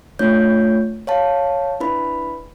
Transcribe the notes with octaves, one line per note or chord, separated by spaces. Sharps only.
A3 D4 F4 C#5 G6
C#5 F5 A5
D4 E4 B4 B5